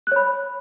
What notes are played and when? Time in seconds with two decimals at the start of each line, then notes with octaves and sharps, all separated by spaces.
0.07 F#6
0.12 C#5
0.16 B5